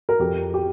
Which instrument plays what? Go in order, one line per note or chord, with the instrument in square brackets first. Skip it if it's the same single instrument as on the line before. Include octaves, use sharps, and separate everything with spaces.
[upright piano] A#4
F2 G4
G4